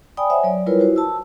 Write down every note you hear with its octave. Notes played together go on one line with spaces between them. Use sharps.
D5 G5 G#5 B5 D#6
C5 C#5 E5 F#5 G#5
F#3 D5
G3 E4 F4 A#4 B4 C#5
E4 F#4 C5
A5 E6